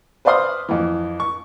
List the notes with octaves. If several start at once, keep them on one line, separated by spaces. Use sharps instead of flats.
B4 C5 D5 F5 C6 D#6
F2 E3
C#6